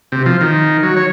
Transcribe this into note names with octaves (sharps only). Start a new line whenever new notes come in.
C3
F3
D#3
F#3
C#5